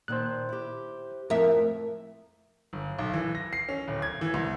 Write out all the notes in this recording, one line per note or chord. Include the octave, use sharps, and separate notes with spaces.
A#2 D#3 C5 A5 F#6
E4 G4
F2 A2 F3 A#4 E5
G1
B1
E3
A#6
C7
C#4
D1
G#6
E3
C2